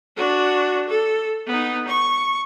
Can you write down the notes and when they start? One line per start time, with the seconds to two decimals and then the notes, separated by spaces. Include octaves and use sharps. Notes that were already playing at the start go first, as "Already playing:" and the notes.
0.17 D4 F#4
0.89 A4
1.47 B3 D#4
1.87 C#6